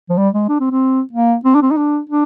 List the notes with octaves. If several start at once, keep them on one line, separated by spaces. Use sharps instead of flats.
F3
G3
G#3
D4
C4
C4
A#3
C4
D4
C4
D#4
D4
D4